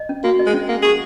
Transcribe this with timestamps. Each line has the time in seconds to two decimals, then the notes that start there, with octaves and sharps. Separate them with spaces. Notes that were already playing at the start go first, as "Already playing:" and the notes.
Already playing: D#5
0.09 C#4
0.24 A#3 F#4
0.39 D#5
0.46 G#3
0.54 C#4
0.69 A#3 F#5
0.82 G#4 C#6